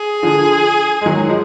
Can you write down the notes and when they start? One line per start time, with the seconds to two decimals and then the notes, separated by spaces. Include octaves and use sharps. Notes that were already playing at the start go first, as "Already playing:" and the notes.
Already playing: G#4
0.23 D3 F3
1.01 G#3
1.06 D#3 F#3
1.18 F#3
1.29 F3 G#3